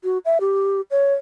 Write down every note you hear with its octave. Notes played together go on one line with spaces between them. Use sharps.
F#4
E5
G4
C#5